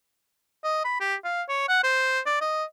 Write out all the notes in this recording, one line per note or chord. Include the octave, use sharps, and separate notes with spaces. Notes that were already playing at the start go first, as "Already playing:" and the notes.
D#5
B5
G4
F5
C#5
F#5
C5
D5
D#5